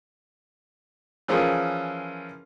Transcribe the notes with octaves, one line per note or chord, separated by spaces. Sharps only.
E3 F3 C#4 F4 G#4 A#4